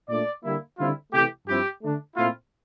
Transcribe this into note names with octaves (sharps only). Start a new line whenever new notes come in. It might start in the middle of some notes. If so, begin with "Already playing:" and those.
A#2 A3 D4 D5
D3 G3 A#3 E4
D3 G3 C4 E4 F4
C3 E3 A3 G4
G2 F3 C4 E4 G4
D3 A3 D4
A#2 A3 C4 E4 F4